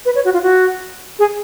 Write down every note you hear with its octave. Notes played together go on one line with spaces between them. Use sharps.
B4
C#5
F#4
F4
F#4
G#4